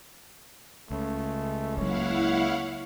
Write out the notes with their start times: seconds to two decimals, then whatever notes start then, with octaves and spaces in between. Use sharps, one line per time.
0.90 C#2 A3
1.77 F#3 A#3 E4 C#5 F5 F#5